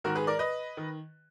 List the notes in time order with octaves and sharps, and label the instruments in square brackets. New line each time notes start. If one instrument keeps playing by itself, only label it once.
[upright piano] G#2 D#3 F#4 A#4
G#4 B4
A#4 D5
B4 D#5
D#3